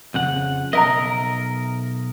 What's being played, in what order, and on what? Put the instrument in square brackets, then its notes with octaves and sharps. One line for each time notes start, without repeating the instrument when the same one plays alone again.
[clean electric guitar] F2 C#3 F#5
[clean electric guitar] B1 A#4 D#5 [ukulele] E5 A#5